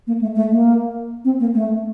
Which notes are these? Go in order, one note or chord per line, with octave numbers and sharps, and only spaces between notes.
A#3
A3
A3
A#3
C4
A#3
A3